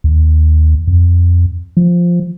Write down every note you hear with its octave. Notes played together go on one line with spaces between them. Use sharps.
D#2
F2
F3